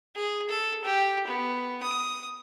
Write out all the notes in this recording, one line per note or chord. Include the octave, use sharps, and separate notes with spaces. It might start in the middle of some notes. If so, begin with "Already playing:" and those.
G#4
A4
G4
B3
D#6